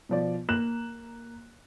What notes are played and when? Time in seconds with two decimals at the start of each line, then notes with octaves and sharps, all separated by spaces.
0.09 B2 F3 D5
0.49 A#3 F#6 E7 F#7